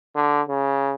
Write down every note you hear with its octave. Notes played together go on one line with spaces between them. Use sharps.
D3
C#3